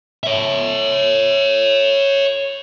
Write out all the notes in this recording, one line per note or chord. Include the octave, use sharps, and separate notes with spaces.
C#5 E5